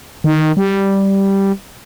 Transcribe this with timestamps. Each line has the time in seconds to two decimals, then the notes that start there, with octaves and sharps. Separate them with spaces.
0.24 D#3
0.57 G3